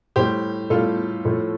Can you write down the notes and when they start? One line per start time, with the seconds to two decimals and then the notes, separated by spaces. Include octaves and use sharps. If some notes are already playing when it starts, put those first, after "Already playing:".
0.16 A2 G3 G4 C5
0.70 A2 G3 F4 A4
1.25 A2 F3 A3